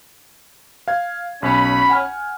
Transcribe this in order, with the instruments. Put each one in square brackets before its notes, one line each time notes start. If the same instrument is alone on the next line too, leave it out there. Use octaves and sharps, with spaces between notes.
[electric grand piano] F5 G#6
[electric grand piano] B1 [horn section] C#4 B5
[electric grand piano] F#5 G#5 F6